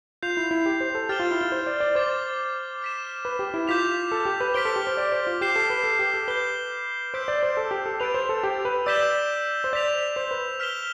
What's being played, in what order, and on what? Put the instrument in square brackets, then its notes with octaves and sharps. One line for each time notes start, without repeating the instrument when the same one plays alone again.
[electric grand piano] F4 [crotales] G6 C7 F7
[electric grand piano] E4
E4
G4
C5
A4
[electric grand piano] G4 [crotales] F6 A6 E7 G7
[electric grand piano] F4
E4
E4
C5
D5
D5
[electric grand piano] C5 [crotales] D6 A6 E7 G7
[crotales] F6 B6 E7
[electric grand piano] B4
G4
E4
[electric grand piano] F4 [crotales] D6 G6 B6 F7
[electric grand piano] A4
G4
B4
[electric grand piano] C5 [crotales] F6 B6 D7 G7
[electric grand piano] A4
G4
C5
D5
C5
F4
[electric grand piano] G4 [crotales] G6 C7 E7 G7
[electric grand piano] A4
B4
A4
G4
A4
[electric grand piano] B4 [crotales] G6 C7 G7
[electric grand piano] C5 [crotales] E6 G6 B6 D7
[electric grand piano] D5
C5
A4
G4
A4
[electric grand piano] B4 [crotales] A6 D7 F7
[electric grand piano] C5
A4
G4
B4
[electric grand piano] D5 [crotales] E6 G6 B6 E7 G7
[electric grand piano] C5
[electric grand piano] D5 [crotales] G6 B6 F7
[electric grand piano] C5
B4
[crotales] F6 B6 E7 G7